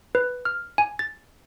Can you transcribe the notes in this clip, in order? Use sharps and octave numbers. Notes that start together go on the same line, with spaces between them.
B4
F6
G#5
A6